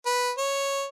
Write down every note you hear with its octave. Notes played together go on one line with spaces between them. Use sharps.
B4
C#5